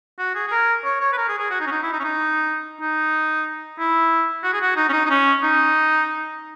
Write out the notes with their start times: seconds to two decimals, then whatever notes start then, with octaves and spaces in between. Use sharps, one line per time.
0.19 F#4
0.35 G#4
0.48 G#4
0.51 A#4
0.84 C#5
1.00 C#5
1.13 B4
1.17 A#4
1.28 G#4
1.38 G#4
1.50 F#4
1.60 D#4
1.67 C#4
1.71 D#4
1.83 E4
1.93 D#4
2.00 C#4
2.04 D#4
2.81 D#4
3.79 E4
4.43 F#4
4.53 G#4
4.61 F#4
4.76 D#4
4.89 C#4
4.93 D#4
5.06 D#4
5.10 C#4
5.43 D#4